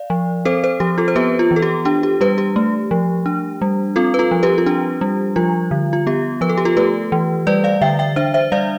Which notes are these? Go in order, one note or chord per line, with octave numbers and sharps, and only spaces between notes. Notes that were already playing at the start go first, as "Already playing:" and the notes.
Already playing: D5 F5
F3
C4 A4 C5
A4 C5
F3 G4
F4 A4
C5
B3 G4 B4
F4
E3
A4
G4
D4 G4
G4
G3 G4 B4
G4
A3
F3
D4
G3
C4 F4 A4
B4
F4 A4
F3
G4 B4
F4
D4 G4
G3
F3 F4
D3
F4
B3 G4
F3 B4
A4
G4
F4 A4
A3 G4 B4
E3
G3 B4 D5
D5 F5
D3 E5 G5
E5 G5
D4 C5 E5
C5 E5
G3 D5 F5